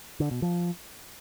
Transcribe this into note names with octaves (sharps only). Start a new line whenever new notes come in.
D3
B2
F3